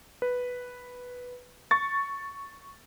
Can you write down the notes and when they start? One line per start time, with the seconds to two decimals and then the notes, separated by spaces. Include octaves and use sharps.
0.22 B4
1.71 C#6 A6